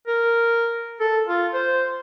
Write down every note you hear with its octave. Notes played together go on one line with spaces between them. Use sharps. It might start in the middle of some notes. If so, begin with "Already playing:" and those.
A#4
A4
F4
C5